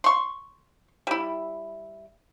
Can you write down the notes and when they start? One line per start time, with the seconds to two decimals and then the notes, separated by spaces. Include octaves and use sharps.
0.04 C6 C#6
1.07 G3 E4